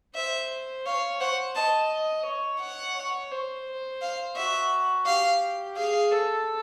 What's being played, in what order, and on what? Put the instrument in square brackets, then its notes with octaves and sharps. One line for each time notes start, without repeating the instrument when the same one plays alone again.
[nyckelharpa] C5 [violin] E5
[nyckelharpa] C#5 [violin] F5
[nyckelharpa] C5 [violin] F#5
[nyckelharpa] D#5 [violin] A5
[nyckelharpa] C#5
[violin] F#5
[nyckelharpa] C#5
C5
[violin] F5
[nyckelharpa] F#4 [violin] E5
[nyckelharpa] G4 [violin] F5
[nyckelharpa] G#4 [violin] F5
[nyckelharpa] A4